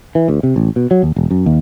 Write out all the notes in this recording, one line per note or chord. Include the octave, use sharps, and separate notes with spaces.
E3
D2
C3
A1
B2
F#3
D#2
E1
F#2
D#2